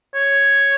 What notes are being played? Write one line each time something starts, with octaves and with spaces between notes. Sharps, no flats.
C#5